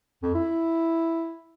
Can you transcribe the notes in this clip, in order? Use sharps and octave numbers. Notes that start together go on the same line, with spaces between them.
F2
E4